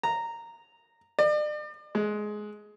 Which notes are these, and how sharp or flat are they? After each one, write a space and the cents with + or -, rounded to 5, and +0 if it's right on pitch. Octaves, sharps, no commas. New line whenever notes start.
A#5 -10
D5 +40
G#3 +15